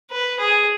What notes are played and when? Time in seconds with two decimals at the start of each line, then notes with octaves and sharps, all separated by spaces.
0.11 B4
0.39 G#4